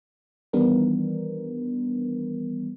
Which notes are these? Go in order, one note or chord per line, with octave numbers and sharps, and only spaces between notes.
D#3 E3 G3 B3 D4 A#4